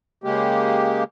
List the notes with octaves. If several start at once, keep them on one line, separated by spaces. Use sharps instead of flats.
C#3 G#3 A#3 G4